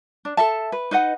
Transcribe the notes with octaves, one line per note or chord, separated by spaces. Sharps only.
D4
A4 E5 A5
B4
D#4 B4 D#5 F#5